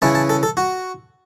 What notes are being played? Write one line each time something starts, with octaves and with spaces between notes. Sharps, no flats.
C#3 E3 C#4 E4 A5
A5
A4
A4
F#4